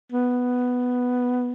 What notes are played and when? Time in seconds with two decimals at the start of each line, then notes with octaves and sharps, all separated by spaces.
0.12 B3